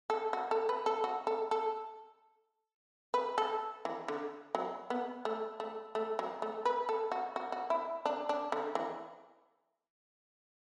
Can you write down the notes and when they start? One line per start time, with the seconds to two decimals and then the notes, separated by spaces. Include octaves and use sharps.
0.10 A4
0.33 F#4
0.51 A4
0.69 B4
0.86 A4
1.04 F#4
1.27 A4
1.51 A4
3.14 B4
3.38 A4
3.85 E3
4.08 D3
4.55 F#3
4.90 B3
5.25 A3
5.60 A3
5.95 A3
6.19 F#3
6.42 A3
6.65 B4
6.89 A4
7.12 F#4
7.36 F#4
7.52 F#4
7.70 E4
8.06 D4
8.29 D4
8.52 D3
8.75 E3